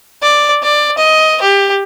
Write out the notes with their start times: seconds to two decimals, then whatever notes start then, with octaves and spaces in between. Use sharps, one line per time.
0.22 D5
0.63 D5
0.98 D#5
1.42 G4